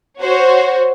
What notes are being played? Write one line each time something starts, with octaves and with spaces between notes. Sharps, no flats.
F#4 C5 C#5